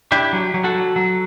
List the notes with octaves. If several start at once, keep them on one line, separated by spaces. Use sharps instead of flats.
D4 E4 G4
F#3
F#3
F#4 A4
F#3
F#3